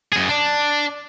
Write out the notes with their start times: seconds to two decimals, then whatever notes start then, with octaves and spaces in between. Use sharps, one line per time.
0.12 F#2 G#4
0.29 D4